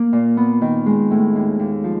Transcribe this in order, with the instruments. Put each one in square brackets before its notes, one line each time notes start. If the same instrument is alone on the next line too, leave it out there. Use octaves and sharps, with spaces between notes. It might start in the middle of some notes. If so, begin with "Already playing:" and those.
Already playing: [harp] A#3
A#2
B3
D#3
G#3
A2
D#2
D#2
F3